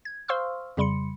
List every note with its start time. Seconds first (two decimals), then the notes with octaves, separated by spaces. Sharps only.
0.05 G#6
0.28 C5 F5 C6 C#6 E6 F6
0.77 F2 C#3 G3 B5 C6 C#7